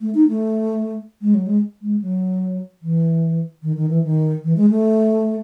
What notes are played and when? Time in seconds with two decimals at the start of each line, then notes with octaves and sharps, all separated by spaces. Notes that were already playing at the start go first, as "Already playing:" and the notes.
0.01 A3
0.15 D#4
0.28 A3
1.22 G#3
1.34 F#3
1.47 G#3
1.82 G#3
2.02 F#3
2.82 E3
3.63 D#3
3.77 D#3
3.90 E3
4.04 D#3
4.44 E3
4.57 G#3
4.70 A3